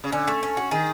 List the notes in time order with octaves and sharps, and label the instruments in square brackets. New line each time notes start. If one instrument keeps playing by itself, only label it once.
[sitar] C#3
[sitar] D3 [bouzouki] C#4
[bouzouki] A3
C#4
F#4
[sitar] D#3 [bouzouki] G#4